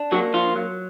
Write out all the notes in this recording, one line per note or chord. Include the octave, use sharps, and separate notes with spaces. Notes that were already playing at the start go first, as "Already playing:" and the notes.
Already playing: D4
F#3 A#3 F#4
F3 F4
F#3